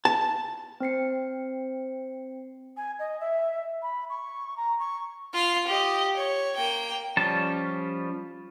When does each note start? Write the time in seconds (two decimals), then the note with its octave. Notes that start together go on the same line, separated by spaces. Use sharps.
0.05 A5
0.80 C4 C5 C7 C#7
2.77 G#5
2.99 D#5
3.20 E5
3.82 B5
4.10 C#6
4.57 A#5
4.79 C#6
5.34 F4 F5
5.67 G4 D#5
6.16 C#5
6.56 A#3 G5
7.17 F3 G3 C#4 A5